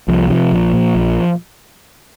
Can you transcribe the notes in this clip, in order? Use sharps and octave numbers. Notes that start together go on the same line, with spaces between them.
C2 F3
C3 F3
A#1
A#2
A#1